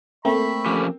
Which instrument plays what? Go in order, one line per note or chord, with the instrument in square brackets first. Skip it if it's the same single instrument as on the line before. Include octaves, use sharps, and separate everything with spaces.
[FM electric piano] A3 [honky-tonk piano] A#3 C4 [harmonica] E5 B5 C#6
[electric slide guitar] F3 C#4 G4